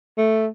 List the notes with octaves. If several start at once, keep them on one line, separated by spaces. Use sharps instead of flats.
A3